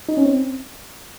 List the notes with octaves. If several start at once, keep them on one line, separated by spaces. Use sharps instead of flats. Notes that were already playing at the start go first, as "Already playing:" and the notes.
D#4
C#4
C4